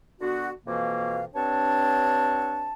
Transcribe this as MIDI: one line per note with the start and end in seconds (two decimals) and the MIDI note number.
0.20 0.49 50
0.20 0.49 59
0.20 0.49 66
0.66 1.23 41
0.66 1.23 47
0.66 1.23 52
0.66 1.23 58
0.66 1.23 77
1.34 2.73 43
1.34 2.73 60
1.34 2.73 62
1.34 2.73 73
1.34 2.73 81